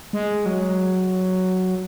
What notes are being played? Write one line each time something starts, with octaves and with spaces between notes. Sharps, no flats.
G#3
F#3